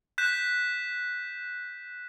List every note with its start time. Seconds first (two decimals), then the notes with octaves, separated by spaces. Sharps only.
0.18 F#6 G6 B6 E7